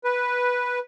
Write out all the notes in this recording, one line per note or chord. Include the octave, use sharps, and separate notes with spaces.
B4